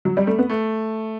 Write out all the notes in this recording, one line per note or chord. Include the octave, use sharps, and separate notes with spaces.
F#3
G3
A3
B3
A3